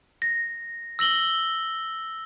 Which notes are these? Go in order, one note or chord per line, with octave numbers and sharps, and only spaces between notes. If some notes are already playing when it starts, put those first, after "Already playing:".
A#6
E6 A#6 F#7 G7